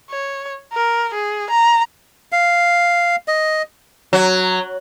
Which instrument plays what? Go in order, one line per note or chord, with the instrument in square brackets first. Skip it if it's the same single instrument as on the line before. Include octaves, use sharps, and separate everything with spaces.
[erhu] C#5
A#4
G#4
A#5
[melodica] F5
D#5
[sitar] F#3